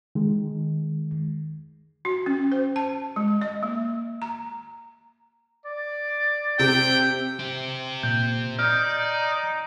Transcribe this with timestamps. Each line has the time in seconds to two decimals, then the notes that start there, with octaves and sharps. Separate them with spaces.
0.15 D#3 G#3
2.05 F#4
2.26 C#4
2.52 C5
2.76 A5
3.16 G#3
3.42 D#5
3.63 A#3
4.22 A#5
5.66 D5
6.59 C3 G5
7.39 C4 G4
8.03 A#2 G6
8.59 D#4 D5 F6 G6